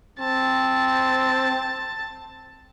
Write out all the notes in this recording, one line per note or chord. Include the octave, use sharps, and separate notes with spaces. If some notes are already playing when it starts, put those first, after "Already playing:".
C4 A5